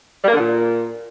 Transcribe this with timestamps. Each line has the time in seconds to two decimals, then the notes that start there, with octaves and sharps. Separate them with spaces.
0.22 G3
0.28 A#3
0.33 D3
0.39 A#2